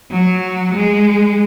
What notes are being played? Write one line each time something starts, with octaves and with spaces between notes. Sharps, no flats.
F#3
G#3